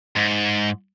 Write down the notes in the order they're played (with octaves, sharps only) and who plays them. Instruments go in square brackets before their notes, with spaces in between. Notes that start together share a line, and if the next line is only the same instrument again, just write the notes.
[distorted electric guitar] G#2